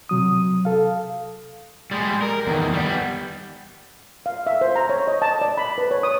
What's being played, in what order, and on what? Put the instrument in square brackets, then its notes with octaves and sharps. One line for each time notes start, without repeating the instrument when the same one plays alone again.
[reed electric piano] C3 F#3 D#6
A4 F5
[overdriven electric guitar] G3 G#3
A#4
E2 D#3
G3 B3
[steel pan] F5
E5
C5
A#5
C#5
D#5
A5
D5
B5
B4
C#5
D#6